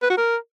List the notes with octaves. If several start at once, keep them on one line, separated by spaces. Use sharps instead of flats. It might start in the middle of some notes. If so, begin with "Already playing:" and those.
B4
F#4
A#4